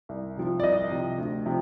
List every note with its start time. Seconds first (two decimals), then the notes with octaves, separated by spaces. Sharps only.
0.09 C2
0.37 C3 F3
0.60 D5
0.63 C2 D#5
0.91 C3 F3
1.18 D2
1.46 C3 F3